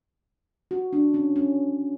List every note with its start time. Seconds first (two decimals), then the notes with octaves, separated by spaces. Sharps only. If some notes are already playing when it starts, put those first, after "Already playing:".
0.71 F#4
0.93 D4
1.14 C#4
1.36 C#4